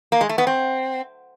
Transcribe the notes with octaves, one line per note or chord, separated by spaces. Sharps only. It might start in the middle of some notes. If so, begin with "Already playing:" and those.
A#3
G#3
A3
B3
C4